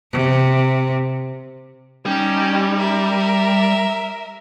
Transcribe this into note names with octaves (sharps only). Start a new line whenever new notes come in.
C3
G3 C#4 D#4 G4
A#4 E5